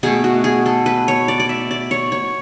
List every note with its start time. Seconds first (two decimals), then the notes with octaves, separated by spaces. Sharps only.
0.03 B2 A3 G#4
0.24 F#4
0.44 G#4
0.66 A4
0.86 B4
1.08 C#5
1.28 D5
1.40 D5
1.49 E5
1.71 D5
1.91 C#5
2.12 C#5